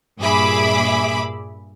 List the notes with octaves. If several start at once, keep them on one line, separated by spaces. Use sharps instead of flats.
G2 A#2 G#4 E5 B5 D6